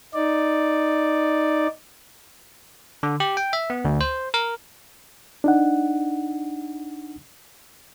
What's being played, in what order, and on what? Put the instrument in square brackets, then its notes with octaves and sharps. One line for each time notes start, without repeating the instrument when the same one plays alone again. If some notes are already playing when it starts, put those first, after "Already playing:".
[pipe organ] D#4 D5
[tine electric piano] D3
G4
G5
E5
B3
D2
C5
A#4
[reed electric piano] D4 D#4 F#5